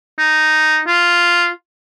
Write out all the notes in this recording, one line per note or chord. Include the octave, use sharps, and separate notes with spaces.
D#4
F4